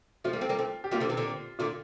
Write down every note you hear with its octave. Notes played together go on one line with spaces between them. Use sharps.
F3 A3 F4
G3 A#3
A3 C4
G3 A#3
A3 C4
G4
G3 A#3 F4
D3 F3
C3 E3
A#2 D3
A#2 D3 F4